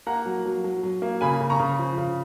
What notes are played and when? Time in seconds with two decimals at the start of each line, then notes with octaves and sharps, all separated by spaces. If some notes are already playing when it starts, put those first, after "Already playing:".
0.07 A#3 F#5 A#5
0.26 F#3
0.45 F#3
0.64 F#3
0.83 F#3
1.02 A#3
1.21 C#3 G#5 B5
1.40 C#3
1.50 A#5 C#6
1.60 C#3
1.79 F3
1.98 C#3